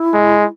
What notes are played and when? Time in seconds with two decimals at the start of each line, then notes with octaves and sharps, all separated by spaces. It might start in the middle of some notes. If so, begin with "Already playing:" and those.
Already playing: E4
0.14 G#3